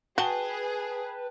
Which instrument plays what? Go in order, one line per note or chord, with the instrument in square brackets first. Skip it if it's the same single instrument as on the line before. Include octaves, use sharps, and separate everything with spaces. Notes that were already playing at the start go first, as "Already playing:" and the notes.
[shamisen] F#4 [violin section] G#4 [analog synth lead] B4 [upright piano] G5 A5 G7